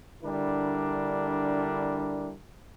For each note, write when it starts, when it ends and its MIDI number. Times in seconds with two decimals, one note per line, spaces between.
0.24 2.34 50
0.24 2.34 55
0.24 2.34 62
0.24 2.34 64
0.24 2.34 70